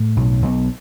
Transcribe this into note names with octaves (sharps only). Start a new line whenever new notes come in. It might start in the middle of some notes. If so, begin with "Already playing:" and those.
Already playing: A2
B1
B1